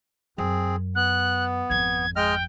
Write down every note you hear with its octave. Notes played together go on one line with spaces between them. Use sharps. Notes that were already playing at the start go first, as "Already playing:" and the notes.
F#2 C4 G#4
B3 F#6
G#1 F2 G#6
G#3 D#5 G5 F6